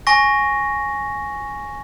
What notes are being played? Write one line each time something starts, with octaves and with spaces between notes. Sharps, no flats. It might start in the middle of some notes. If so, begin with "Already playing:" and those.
G#5 C#6 A#6